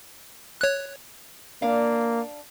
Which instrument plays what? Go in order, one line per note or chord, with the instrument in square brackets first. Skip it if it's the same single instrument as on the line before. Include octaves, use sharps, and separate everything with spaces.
[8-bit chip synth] C#5 F#6
[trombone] A#3 [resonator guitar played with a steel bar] D4 F5